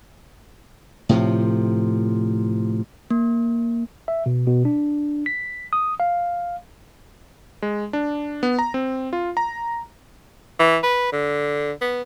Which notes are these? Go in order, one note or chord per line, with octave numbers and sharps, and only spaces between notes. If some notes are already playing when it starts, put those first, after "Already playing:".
A2 C3 F3
A#3
E5
B2
B2
D4
B6
D#6
F5
G#3
D4
B3
A#5
C4
F4
A#5
E3
B4
D3
B3